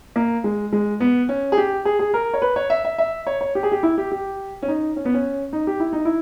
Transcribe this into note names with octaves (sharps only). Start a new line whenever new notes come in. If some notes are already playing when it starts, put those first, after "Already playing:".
A#3
G#3
G#3
B3
C#4
G#4
G4
G#4
G#4
A#4
C#5
B4
C#5
E5
E5
E5
C#5
C#5
G4
G#4
G4
E4
G4
G4
C#4
D#4
C#4
B3
C#4
D#4
G4
E4
D#4
E4